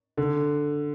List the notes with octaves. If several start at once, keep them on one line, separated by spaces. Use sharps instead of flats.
D3